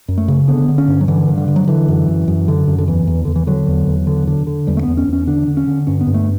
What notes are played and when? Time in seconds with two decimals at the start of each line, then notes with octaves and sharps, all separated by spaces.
0.08 F#2
0.18 A3
0.28 C#3
0.48 D3 B3
0.68 D3
0.78 C#4
0.88 G2
1.01 F#3
1.08 D3 E3
1.29 G2
1.38 D3
1.48 D3
1.56 F#3
1.67 D3 E3
1.88 F#2
2.08 F#2
2.28 F#2
2.48 D3
2.68 F#2
2.78 D3
2.88 E2 E3
3.07 E2
3.25 E2 D3
3.36 E3
3.47 D3 F#3
3.68 E2
3.87 E2
4.07 D3
4.27 D3
4.47 D3
4.67 E2 G3
4.77 A3
4.83 E2 B3
4.97 C#4
5.08 E2
5.13 C#4
5.27 D3 D4
5.47 D3
5.57 C#4
5.67 D3
5.87 G2 C#4
6.01 B3
6.07 G2
6.14 A3